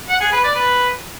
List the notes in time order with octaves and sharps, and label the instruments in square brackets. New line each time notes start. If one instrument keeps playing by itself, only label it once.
[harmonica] F#5
G#4
B4
D5
B4